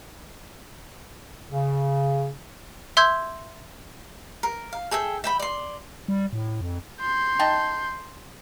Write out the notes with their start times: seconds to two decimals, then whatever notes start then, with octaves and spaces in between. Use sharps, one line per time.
1.51 C#3
2.97 E5 C6 E6 G6 G#6
4.43 A#4
4.73 F5
4.91 G#4 A4 E5 G5
5.24 E5 G5 B5
5.39 D5 C6
6.08 G3
6.33 A2
6.61 F2
7.00 C6 G6
7.39 D#4 G5 A5